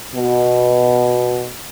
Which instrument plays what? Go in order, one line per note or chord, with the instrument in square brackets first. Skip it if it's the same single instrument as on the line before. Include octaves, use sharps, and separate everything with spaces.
[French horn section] B2